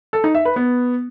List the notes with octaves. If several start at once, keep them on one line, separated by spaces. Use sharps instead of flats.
A4
D#4
E5
B4
B3